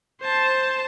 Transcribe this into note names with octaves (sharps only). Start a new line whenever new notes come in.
C5 A5